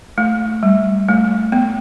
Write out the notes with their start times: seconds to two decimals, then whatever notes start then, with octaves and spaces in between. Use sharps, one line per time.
0.18 A3
0.63 G3
1.08 A3
1.52 B3